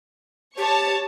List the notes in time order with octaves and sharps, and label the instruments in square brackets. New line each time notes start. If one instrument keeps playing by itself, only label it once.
[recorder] G4 [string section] C#5 A5 C#6